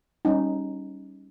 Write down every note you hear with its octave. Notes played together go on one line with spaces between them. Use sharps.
G3 C#4 D#4